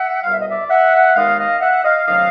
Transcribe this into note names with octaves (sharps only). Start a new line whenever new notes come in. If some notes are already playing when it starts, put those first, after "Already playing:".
Already playing: E5 F#5
C2 B2 G3 F5
E5
D#5
D5 E5
E5 F#5
D#2 D#3 G#3 B3 D#5 F5
D#5 F5
E5 F#5
D#5 F5
C3 D#3 F#3 A3 C#4 D#5 F5